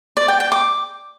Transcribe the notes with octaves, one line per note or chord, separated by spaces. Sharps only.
D5
G5
G5
D6